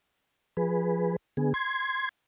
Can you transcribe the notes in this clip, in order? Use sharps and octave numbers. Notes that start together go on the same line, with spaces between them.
F3 G#4 B4
D3 B3 G#4
C6 G#6